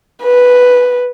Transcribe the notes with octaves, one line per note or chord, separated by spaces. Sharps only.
B4